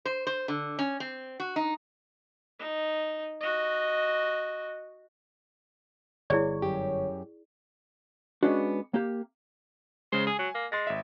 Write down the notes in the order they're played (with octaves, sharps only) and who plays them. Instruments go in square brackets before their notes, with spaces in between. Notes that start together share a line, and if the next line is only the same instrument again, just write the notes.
[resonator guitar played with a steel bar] C5
C5
D3
C#4
C4
F#4
D#4
[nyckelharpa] D#4
F#4 D#5
[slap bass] G1 [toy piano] E4 G#4 D5 [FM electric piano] C#5
[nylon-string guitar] F#2 G4
[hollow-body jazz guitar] G#3 B3 C#4 D4 F#4
A#3 G4
[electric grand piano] C#3 G#3 [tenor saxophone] C5
[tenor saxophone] G#4 [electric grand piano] G#5
[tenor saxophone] F#3
A#3
[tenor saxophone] G#3 [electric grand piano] C6 A6 A#6
[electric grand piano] G#1 E5